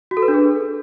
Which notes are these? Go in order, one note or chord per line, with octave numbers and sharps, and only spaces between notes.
F#4
A4
B4
D4
G#4